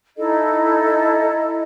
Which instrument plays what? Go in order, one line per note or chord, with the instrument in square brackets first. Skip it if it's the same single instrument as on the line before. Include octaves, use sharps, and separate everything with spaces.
[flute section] D#4 E4 A4 D#5